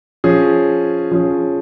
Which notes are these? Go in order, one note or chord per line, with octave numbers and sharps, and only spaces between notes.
F3 C#4 G#4
F3 C#4 G#4